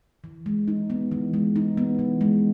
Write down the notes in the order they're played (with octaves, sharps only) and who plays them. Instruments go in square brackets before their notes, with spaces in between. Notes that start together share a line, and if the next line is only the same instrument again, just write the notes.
[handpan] E3
G#3
D#4
B3
E3
G#3
D#4
B3
E3
G#3